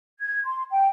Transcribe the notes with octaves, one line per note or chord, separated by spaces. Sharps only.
G#6
C6
G5